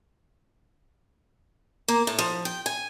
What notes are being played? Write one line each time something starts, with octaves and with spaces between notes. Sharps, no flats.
A#3
A2
F3
G5
G#5